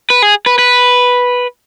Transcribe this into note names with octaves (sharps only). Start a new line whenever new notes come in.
B4
G#4
B4
B4